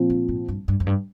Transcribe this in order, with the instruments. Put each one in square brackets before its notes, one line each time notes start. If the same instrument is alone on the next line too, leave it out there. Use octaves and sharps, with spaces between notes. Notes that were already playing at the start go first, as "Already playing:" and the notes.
Already playing: [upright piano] A#2 F3 C4
[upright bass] D3
G#2
G2
G2
F2
G2